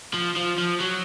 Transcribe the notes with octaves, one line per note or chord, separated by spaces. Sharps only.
F3
F3
F3
F#3